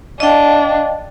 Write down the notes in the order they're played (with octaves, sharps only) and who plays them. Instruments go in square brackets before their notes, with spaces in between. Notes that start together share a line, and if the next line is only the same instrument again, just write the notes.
[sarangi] D4 [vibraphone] D#5 F5 G5